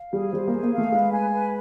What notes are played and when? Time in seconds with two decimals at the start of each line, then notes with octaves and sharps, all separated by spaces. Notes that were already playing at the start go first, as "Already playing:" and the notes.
Already playing: F5
0.13 G3 G#4
0.33 G3 C5
0.48 A#3 G#4
0.63 A#3
0.73 F5
0.78 A3
0.92 G#3 B4
1.12 G#5
1.33 B4